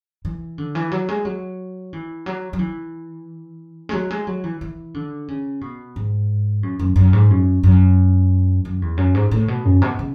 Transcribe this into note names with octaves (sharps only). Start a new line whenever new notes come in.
E3
D3
E3
F#3
G#3
F#3
E3
F#3
F#3
E3
G#3
F#3
G#3
F#3
E3
E3
D3
C#3
B2
G#2
F#2
F#2
F#2
G#2
F#2
F#2
F#2
E2
F#2
G#2
A2
B2
F#2
B2
C#3